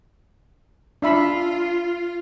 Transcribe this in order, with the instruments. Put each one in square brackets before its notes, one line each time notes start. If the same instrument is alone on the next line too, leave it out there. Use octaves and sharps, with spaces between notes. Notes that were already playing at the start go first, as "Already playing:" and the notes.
[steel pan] D4 E5 B5 [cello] F4